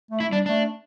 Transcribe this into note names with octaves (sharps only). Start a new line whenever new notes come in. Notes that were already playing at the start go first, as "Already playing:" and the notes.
A3
E4
G3 D4
A3 D4